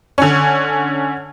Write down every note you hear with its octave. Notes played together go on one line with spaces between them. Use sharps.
D3 C#4